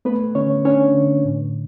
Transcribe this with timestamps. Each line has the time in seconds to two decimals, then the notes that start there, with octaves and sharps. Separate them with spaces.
0.05 A3 B3 B4
0.35 D3 C#4 C#5
0.65 C#4 D4 C#5
0.94 D3
1.25 A2